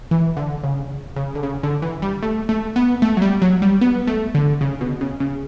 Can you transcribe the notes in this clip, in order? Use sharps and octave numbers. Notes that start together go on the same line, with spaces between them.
E3
D3
C#3
C#3
D3
C#3
D3
E3
G3
A3
A3
B3
A3
F#3
G3
F#3
G3
B3
A3
D3
C#3
B2
C#3
C#3